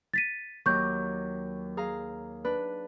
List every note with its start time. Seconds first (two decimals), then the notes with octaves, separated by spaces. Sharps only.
0.13 A6 B6 D#7
0.66 D#2 F#3 C#6 D6 G6
1.77 G#4 F5 A#5
2.45 D4 B4